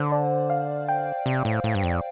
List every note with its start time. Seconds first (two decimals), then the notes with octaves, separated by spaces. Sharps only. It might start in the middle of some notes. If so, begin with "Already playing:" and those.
Already playing: D3 C5
0.12 D5
0.50 F5
0.89 G5
1.26 C3
1.45 A2
1.64 A2
1.75 G2
1.83 F2